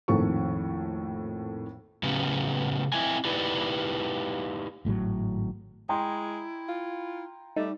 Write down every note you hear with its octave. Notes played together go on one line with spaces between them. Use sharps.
A#1 F2 A2 D#3 A4 C#6
A2 C#3 F#3 B3 C#4 G4
C4 E4 D#5 G#5
D#4 E4 G4 B4 D5
G#1 A2 D3 F#3
G#3 E4 G5 A#5 C6
F4
G3 A3 D#4